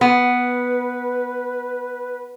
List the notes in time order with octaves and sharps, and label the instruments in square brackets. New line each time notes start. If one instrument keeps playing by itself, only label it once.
[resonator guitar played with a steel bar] B3 [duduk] B4